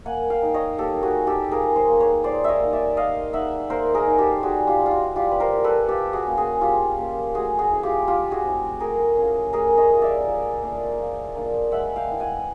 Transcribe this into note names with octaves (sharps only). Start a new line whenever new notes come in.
A#3 F#5 G#5
F5 G5
D#4
C#5 D#5
A#3 G4 A4
F#4 G#4
D#4
G4 A4
F3 G#4 A#4
A#4 C5
A#3 D#4
B4 C#5
F3 C5 D5
C#5 D#5 E5
A#3 D#4
D5 E5
A#3 D#5 F5
D#4 E5 F#5
A#3 A#4 C5
G#4 A#4
D#4
G4 A4
G3 F#4 G#4
F4 G4
B3 E4
F4
F#4
G3 F4 G4
B4
A#4 C5
B3 E4
A4 B4
F3 G4 A4
F#4 G#4
A#3 C#4
F#4 G#4
F3 F4 G4
A#3 C#4
A3 F#4 G#4
F#4 G#4
C4 E4
F4 G4
A3 F4 G4
F#4 G#4
C4 E4
A3 G#4 A#4
C#4 F4
A3 G#4 A#4
C#5 D#5
C#4 F4
D5 E5
F3
A#3 D4 F4
F3
A#3 D4 F4
G#3 E5 F#5
F5 G5
B3 E4
F#5 G#5